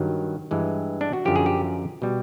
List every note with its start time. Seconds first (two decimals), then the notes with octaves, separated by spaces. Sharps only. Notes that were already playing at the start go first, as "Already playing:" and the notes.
Already playing: G2 D#3 F#3
0.51 G2 E3 G#3
1.01 D4
1.13 F#4
1.25 F#2 D3 F3 G4
1.36 G#4
1.46 G4
2.02 B2 G3